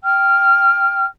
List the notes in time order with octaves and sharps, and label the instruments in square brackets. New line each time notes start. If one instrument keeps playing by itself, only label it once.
[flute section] G5 F6